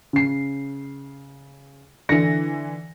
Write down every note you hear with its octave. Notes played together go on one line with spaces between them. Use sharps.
C#3 C7
D3 E3 A#6 C#7